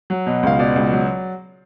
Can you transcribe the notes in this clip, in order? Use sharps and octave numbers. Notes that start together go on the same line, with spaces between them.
F#3
B2
C#2 F5
B2 D5
C#2
F#3